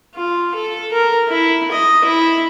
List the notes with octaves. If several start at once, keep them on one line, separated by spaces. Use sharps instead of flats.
F4
A4
A#4
E4
D#5
E4